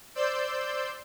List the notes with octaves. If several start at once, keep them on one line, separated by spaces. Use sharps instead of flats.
C5 D5 C6 E6 G6